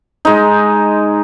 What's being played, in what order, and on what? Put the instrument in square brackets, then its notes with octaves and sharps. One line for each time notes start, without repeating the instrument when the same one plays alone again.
[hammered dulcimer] G#3 D#4